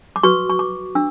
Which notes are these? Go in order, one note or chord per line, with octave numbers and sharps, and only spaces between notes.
D6
F#4 B4 C#6
C#6
D6
D4 E6